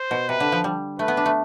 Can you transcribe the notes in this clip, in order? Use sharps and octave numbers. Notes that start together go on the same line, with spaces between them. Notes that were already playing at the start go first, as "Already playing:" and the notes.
Already playing: C5
B2
C3 B4
D3
F3
G3
A3 B4
B3
D4
A3